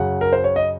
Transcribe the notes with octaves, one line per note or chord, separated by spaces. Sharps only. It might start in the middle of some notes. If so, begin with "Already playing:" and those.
Already playing: F#2 C#3 F#5
A#4
C5
C#5
D#5